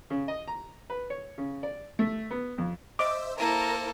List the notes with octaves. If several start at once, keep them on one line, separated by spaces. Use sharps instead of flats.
C#3
D#5
A#5
B4
C#5
C#3
D5
A3
B3
F2
C5 D#5 E5 D6 E6
A#3 E4 A4 A#4 C5